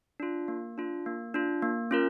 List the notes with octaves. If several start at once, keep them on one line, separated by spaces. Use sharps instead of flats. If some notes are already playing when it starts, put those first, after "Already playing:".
D4 F4
A#3
D4 F4
A#3
D4 F4
A#3
C#4 F4 A#4